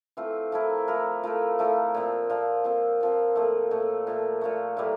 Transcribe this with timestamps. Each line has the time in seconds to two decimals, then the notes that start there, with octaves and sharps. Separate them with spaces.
0.17 E3 A3 C4 F4
0.52 F3 A3 E4 A#4
0.88 F3 A3 E4 A#4
1.24 F3 A3 E4 A#4
1.59 F3 A3 E4 A#4
1.94 A#2 F3 C4
2.29 A#2 F3 C4
2.64 A#2 F3 C4
3.01 A#2 F3 C4
3.36 A#2 F3 A3
3.71 A#2 F3 A3
4.07 A#2 F3 A3
4.41 A#2 F3 A3
4.77 A2 E3 G3 A#3